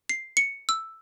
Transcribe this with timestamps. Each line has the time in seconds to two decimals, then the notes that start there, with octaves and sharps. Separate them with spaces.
0.09 C7
0.37 C#7
0.69 E6